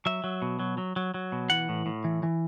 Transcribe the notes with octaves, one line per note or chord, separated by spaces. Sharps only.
F#3 E5
F#3
B2
F#3
F#3
F#3
F#3
B2
E3 F#5
A2
A2
E3
E3